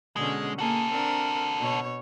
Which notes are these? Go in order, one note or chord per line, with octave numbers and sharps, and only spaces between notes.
B2 D3 G#3 C#4
A#3 F#4 G#4 A4
C4 D4 A#4
B2 C#5